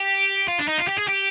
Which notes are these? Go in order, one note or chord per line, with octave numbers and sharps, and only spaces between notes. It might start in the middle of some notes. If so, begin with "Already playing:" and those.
Already playing: G4
F4
D4
D#4
F4
G4
G#4
G4